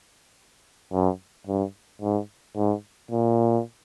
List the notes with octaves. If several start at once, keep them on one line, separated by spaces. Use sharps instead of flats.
F#2
G2
G#2
G#2
A#2